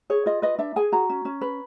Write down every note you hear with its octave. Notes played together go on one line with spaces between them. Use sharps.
G#4 C#5
F4 D#5
B4 D#5
D4 E5
G#4 G#5
F#4 A#5
C#4
C#4
B4